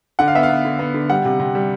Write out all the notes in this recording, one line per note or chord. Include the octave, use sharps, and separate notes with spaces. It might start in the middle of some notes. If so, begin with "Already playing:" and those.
D3 F#5
F5
B3 E5
F5
B3
D3
B3
D3
G3 F#5
C3
C3
G3